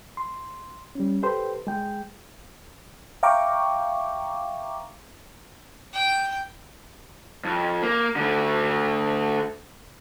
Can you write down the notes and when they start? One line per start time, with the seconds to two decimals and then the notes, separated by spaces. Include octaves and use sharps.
0.17 C6
0.95 G3 C#4
1.23 G4 A4 B4 C5 G5 C6
1.67 G#3 G#4 G5
3.23 E5 F5 G5 A#5 C#6 D6
5.93 G5
7.45 F2
7.83 A#3
8.16 D3 A3